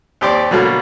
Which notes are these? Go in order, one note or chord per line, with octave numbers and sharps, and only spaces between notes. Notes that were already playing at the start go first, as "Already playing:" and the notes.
D#2 C4 G4 D5 C6 D6
B2 D3 F#3 G3 A#3